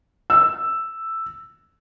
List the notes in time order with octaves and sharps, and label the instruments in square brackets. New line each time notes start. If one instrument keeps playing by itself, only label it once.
[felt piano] E6